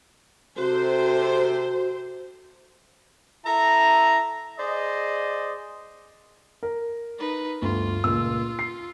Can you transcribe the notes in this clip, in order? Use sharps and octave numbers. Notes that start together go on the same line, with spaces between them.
C3 F#4 A4 C5
E4 A4 E5 A#5
G#4 C5 D5 D#5
A#4
D#4 B4
G1 D2 F4
C#2 A#2 E6
C7